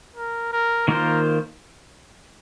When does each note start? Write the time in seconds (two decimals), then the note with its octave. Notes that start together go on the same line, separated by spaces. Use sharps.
0.16 A#4
0.53 A#4
0.88 D#3 A#3 F4 A#4 C5